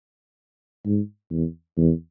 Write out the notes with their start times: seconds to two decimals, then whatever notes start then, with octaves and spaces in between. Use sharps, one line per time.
0.85 G#2
1.31 E2
1.77 E2